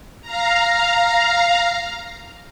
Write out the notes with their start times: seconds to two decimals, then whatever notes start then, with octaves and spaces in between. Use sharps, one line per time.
0.21 F5 A#5